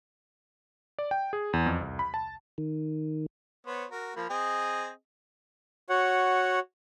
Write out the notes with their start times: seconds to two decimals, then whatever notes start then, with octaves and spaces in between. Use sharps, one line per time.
0.99 D5
1.11 G5
1.33 G#4
1.53 E2
1.66 F2
1.81 C2
1.99 B5
2.14 A5
2.58 D#3
3.67 B3 C5 C#5
3.91 F#4 A#4
4.16 F3 A#3 B5
4.30 C4 G#4 D#5
5.89 F#4 C#5 F#5